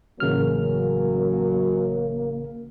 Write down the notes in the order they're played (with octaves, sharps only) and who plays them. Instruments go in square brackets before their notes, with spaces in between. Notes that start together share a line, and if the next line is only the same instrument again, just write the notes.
[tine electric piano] A1 C#3 F6 [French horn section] F#2 F#3 [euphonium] A#3